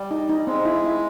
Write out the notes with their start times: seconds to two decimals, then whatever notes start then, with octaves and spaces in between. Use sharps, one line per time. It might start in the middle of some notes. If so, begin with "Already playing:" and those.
Already playing: G3
0.11 D#4
0.29 D#4
0.47 G#3 C4
0.65 E4
0.84 E4